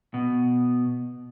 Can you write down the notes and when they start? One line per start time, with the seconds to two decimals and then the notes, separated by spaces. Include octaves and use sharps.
0.14 B2